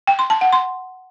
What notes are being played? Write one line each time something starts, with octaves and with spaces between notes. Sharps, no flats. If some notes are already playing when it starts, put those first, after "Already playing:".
G5
C6
A5
F#5
C6